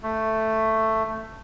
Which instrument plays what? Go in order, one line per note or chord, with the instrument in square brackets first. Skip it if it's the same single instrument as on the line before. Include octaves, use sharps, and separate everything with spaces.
[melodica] A3